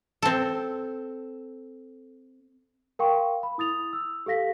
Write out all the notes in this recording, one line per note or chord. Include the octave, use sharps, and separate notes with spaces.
C4 A4
A#4 F5 G5 C6 C#6
B5
E4 D#6 A6 F7
E6
G4 A4 F5 A#6 B6